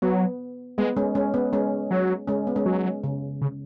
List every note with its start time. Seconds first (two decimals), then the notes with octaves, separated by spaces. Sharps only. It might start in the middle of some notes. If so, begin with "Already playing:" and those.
0.02 F#3 B3
0.78 G#3 B3
0.97 G#3 C#4
1.15 G#3 C#4
1.34 B3
1.53 G#3 C#4
1.91 F#3
2.28 G#3 C#4
2.47 B3
2.56 G#3 C#4
2.65 F#3
3.04 C#3
3.41 C#3